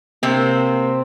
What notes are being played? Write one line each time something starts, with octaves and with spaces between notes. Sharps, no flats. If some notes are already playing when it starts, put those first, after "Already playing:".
C3 A#3 C4